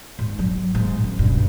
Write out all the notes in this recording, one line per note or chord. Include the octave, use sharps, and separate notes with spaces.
G#2
F#3
G#2
F#2
G2 B2